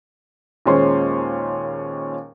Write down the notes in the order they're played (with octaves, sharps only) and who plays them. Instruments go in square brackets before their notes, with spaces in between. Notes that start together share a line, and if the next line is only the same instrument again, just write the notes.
[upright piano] D#2 A#2 G#3 C#4 C5 C6